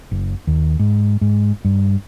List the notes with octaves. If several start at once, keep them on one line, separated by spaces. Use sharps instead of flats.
F#1
D#2
G#2
G#2
G2